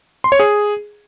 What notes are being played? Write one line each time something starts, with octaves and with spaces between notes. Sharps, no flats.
C6
C#5
G#4